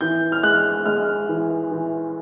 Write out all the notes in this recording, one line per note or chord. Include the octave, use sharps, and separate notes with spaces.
E3 G6
F6
G#3 F#6
G#3 F6
E3
E3